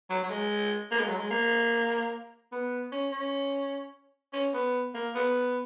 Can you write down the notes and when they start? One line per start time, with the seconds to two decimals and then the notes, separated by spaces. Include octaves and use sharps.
0.10 F#3
0.23 F#3
0.30 G#3
0.91 A#3
0.99 G#3
1.08 F#3
1.17 G#3
1.31 A#3
2.52 B3
2.92 C#4
3.12 C#4
4.33 C#4
4.54 B3
4.94 A#3
5.15 B3